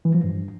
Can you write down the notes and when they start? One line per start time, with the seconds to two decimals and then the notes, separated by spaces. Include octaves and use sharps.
0.05 E3
0.14 F3
0.24 G2